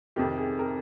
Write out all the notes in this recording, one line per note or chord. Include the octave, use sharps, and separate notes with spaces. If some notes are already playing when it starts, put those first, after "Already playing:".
F2 C3 D#3 G4
G#4
A#4